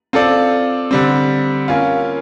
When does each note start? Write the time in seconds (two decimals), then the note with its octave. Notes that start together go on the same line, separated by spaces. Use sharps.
0.13 C4 F4 A4 D5
0.91 D3 G3 C4
1.68 A#3 C#4 F4